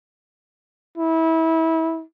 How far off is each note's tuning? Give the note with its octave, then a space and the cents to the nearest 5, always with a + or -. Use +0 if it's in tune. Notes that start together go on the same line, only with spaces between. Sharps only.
E4 -25